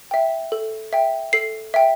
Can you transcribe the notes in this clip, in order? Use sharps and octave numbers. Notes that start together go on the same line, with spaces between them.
E5 G5
A4
E5 G5
A4 C7
E5 G5